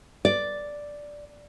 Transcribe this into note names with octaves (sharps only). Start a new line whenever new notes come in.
D5